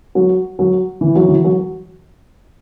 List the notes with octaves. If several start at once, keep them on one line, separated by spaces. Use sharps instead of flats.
F#3
F#3
E3
F#3
E3
F#3